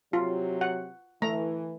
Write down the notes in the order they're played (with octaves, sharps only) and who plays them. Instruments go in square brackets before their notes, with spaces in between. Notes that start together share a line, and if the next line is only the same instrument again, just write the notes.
[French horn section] C3 F#3 [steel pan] F4
[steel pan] F#5
[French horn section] E3 [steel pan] A3 A#5